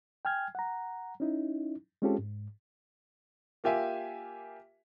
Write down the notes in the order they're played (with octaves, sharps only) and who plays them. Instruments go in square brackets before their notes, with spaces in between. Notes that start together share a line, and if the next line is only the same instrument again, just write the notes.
[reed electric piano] G5 G#5 F6 G#6
F#5 A#5
C#4 D#4 E4
G#3 C4 C#4 F4 G4 A4
G#2
[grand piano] A#3 F4 G4 E5 G#5